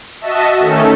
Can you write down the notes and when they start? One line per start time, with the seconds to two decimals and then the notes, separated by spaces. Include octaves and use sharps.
0.21 F#4 D#5 E5 A5
0.60 D#3 A3 C#4 A4